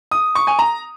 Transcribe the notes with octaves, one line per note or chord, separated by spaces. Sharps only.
D#6
C#6
G#5
A#5